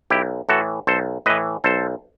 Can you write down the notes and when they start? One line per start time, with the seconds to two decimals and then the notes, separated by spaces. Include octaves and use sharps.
0.10 B1 E4 G4
0.49 A2 E3 F#4 A4
0.87 B1 A4 C5
1.26 A2 E3 B4 D#5
1.64 B1 A4 C5